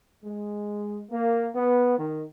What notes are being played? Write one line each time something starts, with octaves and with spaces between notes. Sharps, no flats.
G#3
A#3
B3
D#3